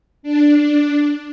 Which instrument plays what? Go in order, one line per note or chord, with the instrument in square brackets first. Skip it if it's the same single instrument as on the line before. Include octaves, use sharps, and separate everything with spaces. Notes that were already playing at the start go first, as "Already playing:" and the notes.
[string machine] D4